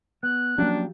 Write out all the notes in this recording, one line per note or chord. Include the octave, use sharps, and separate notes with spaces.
B3 F#6
F3 F#3 A#3 C#4 D4 G4